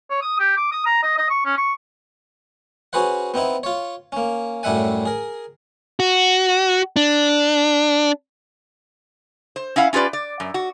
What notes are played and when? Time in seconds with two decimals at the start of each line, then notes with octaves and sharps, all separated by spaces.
0.10 C#5
0.22 D#6
0.39 G4
0.57 D6
0.72 D#6
0.86 A#5
1.03 D#5
1.18 D#5
1.30 C#6
1.46 C#4
1.58 C#6
2.93 C#4 F#4 G#4 B4 C5 F#5
3.34 B3 C4 D#4 E4
3.63 F4 C#5
4.12 A#3 C#4
4.63 F#2 A2 G3 E5 F#5 G#5
5.06 G#4 A#4
6.00 F#4
6.96 D4
9.56 C5
9.76 C#4 E4 F5 F#5
9.93 C#4 F4 G4 B4 D5
10.13 D5
10.40 F#2
10.54 F#4